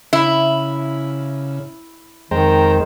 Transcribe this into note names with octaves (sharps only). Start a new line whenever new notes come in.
C#3 E4
F2 D#3 G#3 C5 G5 A#5